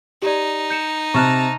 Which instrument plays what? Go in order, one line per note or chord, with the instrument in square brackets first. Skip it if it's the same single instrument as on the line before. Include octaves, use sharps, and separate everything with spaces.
[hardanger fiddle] D#4 [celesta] G4 D5
[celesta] G6 C#7 E7
[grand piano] C3 [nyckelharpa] A5 A#5 [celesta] C#6 F6 F#6